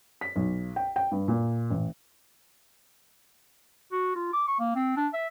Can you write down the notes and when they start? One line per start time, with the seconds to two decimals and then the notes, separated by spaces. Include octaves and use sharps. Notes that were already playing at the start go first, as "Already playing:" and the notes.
0.21 B6
0.36 B1
0.76 G5
0.96 G5
1.11 G2
1.28 A#2
1.70 A1
3.92 F#4
4.16 F4
4.33 D6
4.47 C#6
4.60 A#3
4.76 C4
4.97 D4
5.13 E5